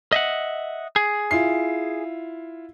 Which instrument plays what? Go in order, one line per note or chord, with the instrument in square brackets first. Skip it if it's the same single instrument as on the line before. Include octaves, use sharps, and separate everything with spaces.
[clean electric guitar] D#5 E5 F#5
G#4
[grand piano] E4 F4 C7